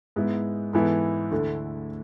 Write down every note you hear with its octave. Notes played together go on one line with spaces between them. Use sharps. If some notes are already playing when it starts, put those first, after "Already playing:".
G#2 G#3 B3 E4
G#2 E3 B3 E4 A4
D2 D3 A3 E4 A4